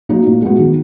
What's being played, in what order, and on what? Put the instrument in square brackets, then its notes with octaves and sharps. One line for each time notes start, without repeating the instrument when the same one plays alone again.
[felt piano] F#3 A#3 D#4 F#4
A#2
G#3 B3 F#4
D#3